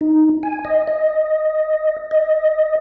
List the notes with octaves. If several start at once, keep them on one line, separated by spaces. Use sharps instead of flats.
D#4
G#5
D#5
D#5
D#5